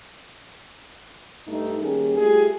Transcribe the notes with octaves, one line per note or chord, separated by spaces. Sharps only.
G2 A3 D#4
D#3 G3 A#3 C#4 G#4
G3 A3 F4 G4 G#4